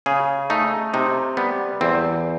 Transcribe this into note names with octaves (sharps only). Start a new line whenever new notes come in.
C#3 G#4
A3 D#4
C3 D#4
G3 B3
E2 C4